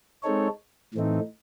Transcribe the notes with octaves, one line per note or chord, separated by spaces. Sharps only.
G#3 C4 D#4 A4 C#5
A2 E3 A3 C4 D#4